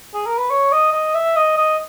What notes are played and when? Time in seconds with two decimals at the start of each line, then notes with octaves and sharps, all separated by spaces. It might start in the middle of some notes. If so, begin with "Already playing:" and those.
0.14 G#4
0.26 A#4
0.37 B4
0.50 C#5
0.72 D#5
0.93 D#5
1.15 E5
1.36 D#5
1.58 D#5